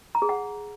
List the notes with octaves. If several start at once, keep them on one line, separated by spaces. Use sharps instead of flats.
A#5
G#4
F#5